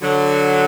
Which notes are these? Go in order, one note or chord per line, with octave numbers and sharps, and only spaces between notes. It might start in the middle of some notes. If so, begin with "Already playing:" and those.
D3 F#3